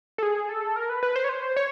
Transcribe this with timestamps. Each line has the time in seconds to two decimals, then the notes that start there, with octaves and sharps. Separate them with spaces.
0.18 A4
0.23 G#4
0.49 A4
0.76 A#4
0.89 B4
1.03 B4
1.16 C5
1.24 C#5
1.29 C5
1.56 C#5